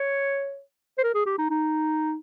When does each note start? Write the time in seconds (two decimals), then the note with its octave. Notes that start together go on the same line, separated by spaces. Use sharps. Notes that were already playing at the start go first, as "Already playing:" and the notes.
Already playing: C#5
0.98 C5
1.04 A#4
1.15 G#4
1.26 G4
1.38 D#4
1.50 D#4